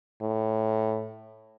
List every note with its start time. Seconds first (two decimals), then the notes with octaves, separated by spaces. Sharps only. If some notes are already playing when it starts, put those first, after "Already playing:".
0.22 A2